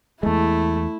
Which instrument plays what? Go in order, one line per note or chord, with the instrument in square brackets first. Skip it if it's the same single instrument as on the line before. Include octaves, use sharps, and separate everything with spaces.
[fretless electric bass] E2 G#3 [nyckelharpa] A3 [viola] E4